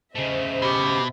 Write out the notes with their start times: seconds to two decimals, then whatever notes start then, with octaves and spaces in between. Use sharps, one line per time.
0.15 C#3 A3 C5 D#5 E5
0.62 B2 G4